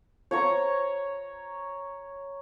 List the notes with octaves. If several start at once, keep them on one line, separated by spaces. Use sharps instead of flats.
C#5 A#5 C#6